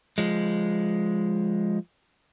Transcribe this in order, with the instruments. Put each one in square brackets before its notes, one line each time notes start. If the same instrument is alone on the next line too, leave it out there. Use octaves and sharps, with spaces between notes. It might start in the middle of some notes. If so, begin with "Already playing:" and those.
[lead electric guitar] F3 G#3